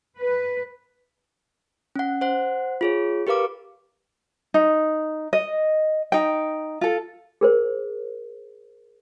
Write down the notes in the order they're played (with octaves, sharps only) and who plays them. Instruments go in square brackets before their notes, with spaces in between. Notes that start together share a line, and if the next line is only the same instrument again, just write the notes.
[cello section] B4
[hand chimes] C#4 F#5
C5 F#5
F4 G#4 C#5
G4 A#4 B4 F5 D6
[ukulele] D#4
D#5
D#4 G5
F4 A4
[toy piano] G#4 A#4 C5